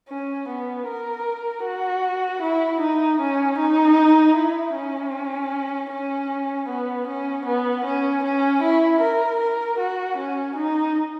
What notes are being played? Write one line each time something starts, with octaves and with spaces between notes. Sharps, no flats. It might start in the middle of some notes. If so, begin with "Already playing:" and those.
C#4
B3
A#4
F#4
E4
D#4
C#4
D#4
E4
C#4
C#4
B3
C#4
B3
C#4
C#4
E4
A#4
A#4
F#4
C#4
D#4